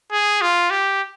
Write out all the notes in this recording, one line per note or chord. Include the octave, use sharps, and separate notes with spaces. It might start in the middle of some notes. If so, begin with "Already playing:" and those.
G#4
F4
G4